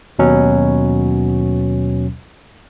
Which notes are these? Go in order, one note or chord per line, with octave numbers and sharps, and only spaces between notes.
D#2 B2 F#3 C#4